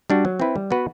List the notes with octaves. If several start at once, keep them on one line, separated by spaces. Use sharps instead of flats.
G3 D4 F#4
F#3
C4 E4 B4
G3
B3 F#4 B4